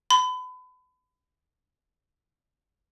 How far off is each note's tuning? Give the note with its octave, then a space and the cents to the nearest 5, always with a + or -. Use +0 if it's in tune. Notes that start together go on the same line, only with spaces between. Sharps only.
B5 +35